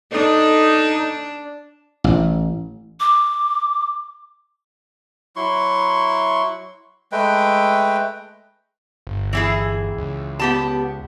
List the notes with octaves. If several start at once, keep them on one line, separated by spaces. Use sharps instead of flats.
D4 D#4 A4
A1
D6
F#3 E4 C6 C#6
G#3 A3 B4 G5
G1
E3 E4 G#4
C#2
B3 G4 A5